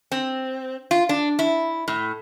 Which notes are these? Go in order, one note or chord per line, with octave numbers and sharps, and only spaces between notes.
C4
F4
D4
E4
A2